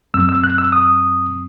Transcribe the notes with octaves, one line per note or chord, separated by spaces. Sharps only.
F#2 F#3 C4 E6
E6
F#6
E6
D#6